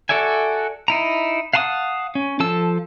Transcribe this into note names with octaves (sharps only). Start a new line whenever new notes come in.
F#4 A4 D5 E5 G#5
D#4 E4 A#5
F5 F#5 A5 B5 D#6
C#4
F3 A4 A5 E6